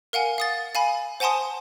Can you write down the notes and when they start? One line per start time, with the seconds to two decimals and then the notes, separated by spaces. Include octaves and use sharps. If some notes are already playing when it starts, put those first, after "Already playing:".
0.13 A#4 F5 F#5 G#5
0.38 F5 D#6 A6
0.75 F5 G#5 B5
1.20 C5 F#5 G#5 A5 C6 D#6